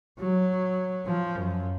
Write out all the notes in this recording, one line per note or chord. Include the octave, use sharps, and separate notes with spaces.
F#3
F3
F#2